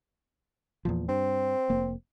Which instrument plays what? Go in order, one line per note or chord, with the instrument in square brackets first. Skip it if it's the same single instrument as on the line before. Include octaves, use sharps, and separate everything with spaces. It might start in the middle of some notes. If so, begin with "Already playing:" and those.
[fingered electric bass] E2 A#2 F3
[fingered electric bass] G2 [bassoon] C4
[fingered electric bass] F1 A#3